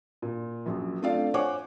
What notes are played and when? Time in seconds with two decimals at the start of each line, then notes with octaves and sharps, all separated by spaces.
0.22 A#2
0.66 A#1 F#2
1.02 A3 C4 D4 F4 D5 F5
1.34 C5 C#5 F#5 G#5 C#6 D6